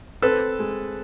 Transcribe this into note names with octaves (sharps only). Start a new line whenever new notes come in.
C4 A4 B4
G#3